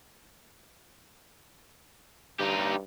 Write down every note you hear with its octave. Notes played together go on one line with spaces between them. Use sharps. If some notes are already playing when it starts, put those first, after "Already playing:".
G2 D#4 G4